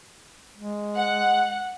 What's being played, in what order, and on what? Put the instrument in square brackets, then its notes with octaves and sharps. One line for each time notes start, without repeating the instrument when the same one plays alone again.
[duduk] G#3
[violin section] F#5